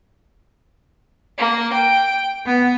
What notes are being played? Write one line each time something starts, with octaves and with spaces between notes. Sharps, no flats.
A#3
G5
B3